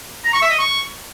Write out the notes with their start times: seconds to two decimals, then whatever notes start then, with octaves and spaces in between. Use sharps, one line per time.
0.25 A#5
0.33 C#6
0.42 E5
0.50 D#5
0.59 C#6